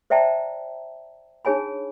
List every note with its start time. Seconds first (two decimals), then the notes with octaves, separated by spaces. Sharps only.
0.10 C5 D5 E5 G5 A5 A#5
1.45 D4 D#4 G#4 C#5 G#5 B5